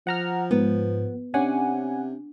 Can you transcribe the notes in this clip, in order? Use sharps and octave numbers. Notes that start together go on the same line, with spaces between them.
F3 F#5 A#5 F6
G#2 B3
C3 C#4 D4 F#5 G#5